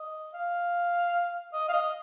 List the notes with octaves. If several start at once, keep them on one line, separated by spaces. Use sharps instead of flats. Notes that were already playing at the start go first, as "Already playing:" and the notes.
Already playing: D#5
F5
D#5
F5
D#5